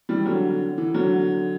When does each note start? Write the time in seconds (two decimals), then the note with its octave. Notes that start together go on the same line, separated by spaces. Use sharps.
0.09 E3 G3
0.26 D3 F#3
0.78 E3
0.94 D3 F#3